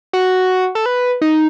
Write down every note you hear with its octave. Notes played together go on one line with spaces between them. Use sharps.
F#4
A4
B4
D#4